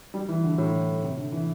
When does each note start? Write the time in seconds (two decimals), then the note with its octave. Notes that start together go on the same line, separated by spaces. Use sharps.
0.14 G3
0.29 E3
0.44 D3
0.58 A2
1.03 C3
1.17 D3
1.32 E3